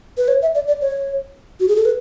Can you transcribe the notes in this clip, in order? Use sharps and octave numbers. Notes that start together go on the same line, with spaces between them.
B4
C#5
E5
D5
D5
C#5
F#4
G#4
A4
B4